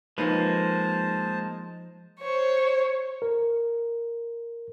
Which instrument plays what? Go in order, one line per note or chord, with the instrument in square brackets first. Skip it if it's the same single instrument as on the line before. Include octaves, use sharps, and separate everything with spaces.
[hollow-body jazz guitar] F3 D#4 B4 [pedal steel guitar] G#3 A#3 [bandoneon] C5 A5
[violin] C5 C#5
[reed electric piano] A#4